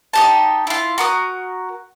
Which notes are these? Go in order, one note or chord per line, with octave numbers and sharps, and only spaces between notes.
D#4 G4 A5
E4 F4
F#4 A#4 D#6